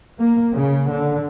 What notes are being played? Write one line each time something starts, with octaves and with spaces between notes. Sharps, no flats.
A#3
C#3
D3